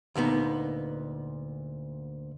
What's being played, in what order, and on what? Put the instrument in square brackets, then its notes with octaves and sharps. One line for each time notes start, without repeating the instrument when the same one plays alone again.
[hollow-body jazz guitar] D2 A#2 B3 D#4